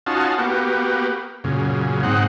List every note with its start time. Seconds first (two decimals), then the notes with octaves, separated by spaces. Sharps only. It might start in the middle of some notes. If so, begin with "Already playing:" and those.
0.06 C#4 D#4 F4 F#4 A5
0.39 A#3 B3 F#4 G4
1.44 F#2 A#2 C#3
2.03 G#2 C4 D#4 F#5